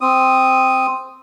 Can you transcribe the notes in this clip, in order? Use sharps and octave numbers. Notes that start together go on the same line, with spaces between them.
C4 D#6